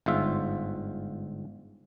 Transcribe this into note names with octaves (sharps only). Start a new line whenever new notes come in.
G1 G#2 F4 E5